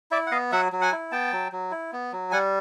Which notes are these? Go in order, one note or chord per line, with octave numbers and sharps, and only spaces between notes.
E4 D5 E5
F#5
B3 D#5 F5
F#3 E5 F#5
F#3
F#5 G#5
E4
B3 G5 A5
F#3
F#3
E4
B3
F#3
G3 F#5 G#5